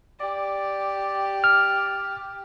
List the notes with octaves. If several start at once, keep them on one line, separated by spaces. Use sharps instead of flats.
G4 D5
F6